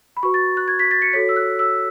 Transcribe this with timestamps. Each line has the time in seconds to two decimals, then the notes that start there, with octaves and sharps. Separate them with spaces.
0.17 B5
0.23 F#4 B4 C#6
0.34 A6
0.57 F#6
0.68 G#6
0.79 B6
0.91 A6
1.02 C#7
1.13 F#4 A4 C#5 B6
1.29 E6
1.36 F#6
1.59 E6